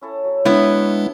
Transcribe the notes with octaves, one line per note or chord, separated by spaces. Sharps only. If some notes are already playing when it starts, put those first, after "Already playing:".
C#4 E4 A4
F#3
G#3 B3 D4 E4